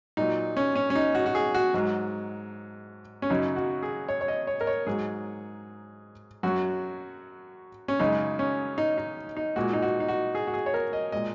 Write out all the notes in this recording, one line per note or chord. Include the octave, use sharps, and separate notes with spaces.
A#2 F#3 D#4
C#4
C#4
C#4
D#4
F#4
F#4
G#4
F#4
G#2 F#3
C#4
F#2 C#3 F#3 D#4
F#4
G#4
C#5
C#5
D#5
C#5
A#4
C#5
G#2 F#3 G#4
F#2 F#3 F#4
C#4
F#2 C#3 G#3 D#4
C#4
D#4
D#4
D#4
A#2 G#3 F#4
D#4
F#4
D#4
F#4
G#4
F#4
G#4
C#5
A#4
D#5
A#2 G#3 D#5